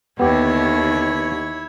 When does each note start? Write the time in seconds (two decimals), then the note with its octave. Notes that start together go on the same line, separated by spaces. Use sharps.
0.19 D#2 D3 B3 E4 G4 C#5